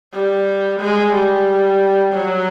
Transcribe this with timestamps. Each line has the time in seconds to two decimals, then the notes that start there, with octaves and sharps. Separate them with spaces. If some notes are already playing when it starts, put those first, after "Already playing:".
0.13 G3
0.80 G#3
1.13 G3
2.13 F#3